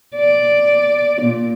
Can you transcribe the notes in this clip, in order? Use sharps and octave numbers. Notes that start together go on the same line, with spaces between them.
D5
A#2